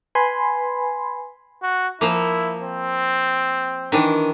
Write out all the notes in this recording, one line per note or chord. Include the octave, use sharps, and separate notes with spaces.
B4 G#5 B5 C6
F#4
F3 A#3 E4
C4
D#3 E3 D4